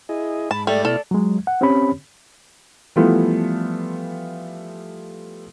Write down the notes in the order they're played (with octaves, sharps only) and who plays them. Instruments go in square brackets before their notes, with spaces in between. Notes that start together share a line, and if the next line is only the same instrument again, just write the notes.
[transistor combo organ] E4 G#4 D#5
[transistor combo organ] G#2 [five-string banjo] A5 [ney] B5
[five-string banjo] G3 [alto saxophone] A3 [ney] D5
[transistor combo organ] B2 E4 F6 [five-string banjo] A4 [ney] D5
[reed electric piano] F#3 G#3
F#5
C4 C#4 G4 C#5 B5
[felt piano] E3 F3 G3 A3 B3 F4